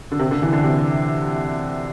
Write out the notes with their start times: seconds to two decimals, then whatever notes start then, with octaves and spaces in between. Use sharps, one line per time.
0.12 D3
0.19 C3
0.31 D3
0.42 E3
0.53 D3
0.64 C3